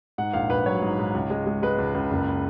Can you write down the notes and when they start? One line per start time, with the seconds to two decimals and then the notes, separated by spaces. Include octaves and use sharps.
0.18 G#2 F#5
0.33 A#1 F5
0.50 A#1 B4
0.66 F#3 C#5
0.82 G#2
0.99 G#2
1.14 C#2
1.30 G#3
1.46 G#3
1.63 G#3 B4
1.78 C#2
1.95 C#2
2.11 F#1